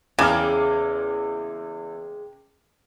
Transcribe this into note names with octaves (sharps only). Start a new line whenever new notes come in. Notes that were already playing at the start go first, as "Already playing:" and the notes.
E2 C#3 G#3 A#3 G5 D6 F6